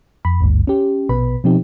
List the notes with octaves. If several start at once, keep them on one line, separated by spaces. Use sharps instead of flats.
F2 B5
G#1 D2 G2
C#4 G4
A#1 B2 B4 B5
B2 F3 C4 D#4 G4